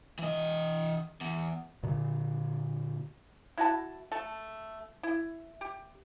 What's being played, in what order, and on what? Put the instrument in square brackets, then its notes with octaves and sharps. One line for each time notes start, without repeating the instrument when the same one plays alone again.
[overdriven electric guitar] E3 D#5
E2
[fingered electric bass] A#2 D3
[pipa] E4 F#4 A5
A3 A4 A5
E4
G4